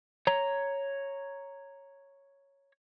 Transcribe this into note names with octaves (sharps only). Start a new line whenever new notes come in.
C#5 A#5